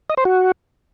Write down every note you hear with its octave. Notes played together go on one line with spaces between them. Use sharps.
D#5
C5
F#4